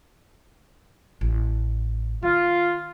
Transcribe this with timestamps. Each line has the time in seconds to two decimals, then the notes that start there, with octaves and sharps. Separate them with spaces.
1.21 A1
2.23 D#3 F4